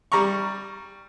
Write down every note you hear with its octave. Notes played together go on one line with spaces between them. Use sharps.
G3 A#5 C#6